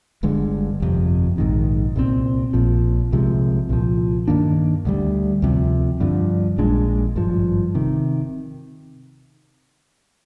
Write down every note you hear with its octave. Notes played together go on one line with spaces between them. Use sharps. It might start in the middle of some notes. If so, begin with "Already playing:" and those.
G1 G2 D3 G#3
G1 F2 C3
A#1 G#2 D#3
C2 A#2 G3 C4
A#1 A#2 F3
C2 C3 F3 G#3
C2 A#2 F3
G2 D#3 A#3 D4
D2 D3 G3
D2 C3 F3
G2 D3 F3
A#1 A#2 G#3 D4
G#1 G2 F3
C3 D#3